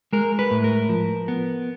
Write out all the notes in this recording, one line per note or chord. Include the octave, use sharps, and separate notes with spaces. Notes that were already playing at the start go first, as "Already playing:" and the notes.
G#3 A#4
B4
A2
A#4
F3
B3